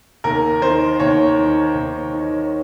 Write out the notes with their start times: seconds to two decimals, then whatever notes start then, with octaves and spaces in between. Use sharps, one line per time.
0.24 D#2 A#4
0.62 D#3 C5
1.00 D#2 C#5
1.37 D#3
1.75 D#2
2.13 D#3